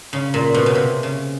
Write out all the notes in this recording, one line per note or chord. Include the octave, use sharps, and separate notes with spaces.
C#3
A#2
B2
C#3
C3
C#3